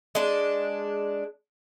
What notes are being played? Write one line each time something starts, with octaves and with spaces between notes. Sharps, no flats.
G#3 D4